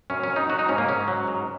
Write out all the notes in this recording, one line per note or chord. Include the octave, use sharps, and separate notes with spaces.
F#2 C#4
C#4
F#2
D#4
F#3 F#4
D#4
G#2 C#4
A#3
G#2 C#4
F#3
G#2